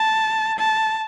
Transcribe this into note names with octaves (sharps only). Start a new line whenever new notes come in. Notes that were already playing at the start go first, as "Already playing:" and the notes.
Already playing: A5
A5